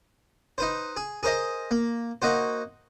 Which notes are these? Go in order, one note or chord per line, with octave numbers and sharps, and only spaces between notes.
D#4 B4 C5
G#4
G#4 A#4 C5 D#5
A#3
A#3 D#4 F#4 C5